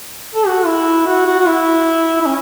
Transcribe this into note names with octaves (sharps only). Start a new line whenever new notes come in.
A4
F#4
E4
F#4
F#4
F#4
E4
E4
C#4